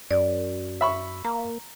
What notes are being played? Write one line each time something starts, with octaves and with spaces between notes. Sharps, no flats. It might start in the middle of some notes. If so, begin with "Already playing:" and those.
F#2 D5
E5 B5 C#6
A#3 A#5